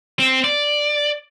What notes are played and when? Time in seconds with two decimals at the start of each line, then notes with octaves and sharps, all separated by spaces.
0.19 C4
0.44 D5